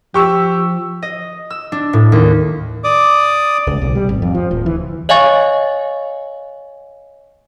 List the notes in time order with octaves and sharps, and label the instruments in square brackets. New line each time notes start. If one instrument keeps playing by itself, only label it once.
[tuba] F3 [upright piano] G4 C#6 E6
[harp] D#5
E6
D4
A2
D#2
[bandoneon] D5 D6 D#6
[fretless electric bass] C#2
B1
G3
G#1
F2
F3
D1
E3
[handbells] C#5 D#5 F5 G#5 C#6 A6